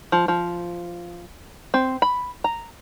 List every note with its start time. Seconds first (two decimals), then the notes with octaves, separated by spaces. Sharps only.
0.12 F3
0.28 F3
1.74 C4
2.02 B5
2.44 A#5